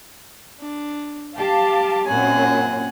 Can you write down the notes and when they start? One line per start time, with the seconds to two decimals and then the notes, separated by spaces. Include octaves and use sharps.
0.60 D4
1.36 G4 F5 A5 D6
2.06 F#2 A#2 C4 F#5 G#5